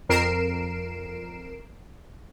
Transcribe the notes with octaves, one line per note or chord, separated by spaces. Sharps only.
F2 A#4 C7 D7 E7